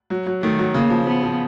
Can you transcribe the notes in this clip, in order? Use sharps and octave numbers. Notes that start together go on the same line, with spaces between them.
F#3
F#3
D#3 A3
F#3
C#3 A#3
F3
F3 B3
F3